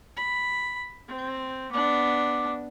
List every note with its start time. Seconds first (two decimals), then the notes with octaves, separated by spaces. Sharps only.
0.17 B5
1.08 C4
1.72 B3 D4 D6